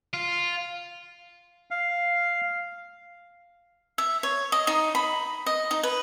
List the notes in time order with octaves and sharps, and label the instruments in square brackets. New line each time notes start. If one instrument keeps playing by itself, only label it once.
[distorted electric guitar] F4
[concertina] F5
[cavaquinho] E5
C#5
D#5
D#4
B5
D#5
D#4
B4